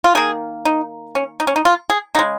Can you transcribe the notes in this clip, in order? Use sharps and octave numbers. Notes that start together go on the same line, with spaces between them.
F4
D#3 A#3 G#4
D#4
C#4
D#4
C#4
D#4
F4
G#4
C#3 G#3 D#4